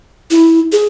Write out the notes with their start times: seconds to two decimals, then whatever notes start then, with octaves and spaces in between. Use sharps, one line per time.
0.31 E4
0.72 G#4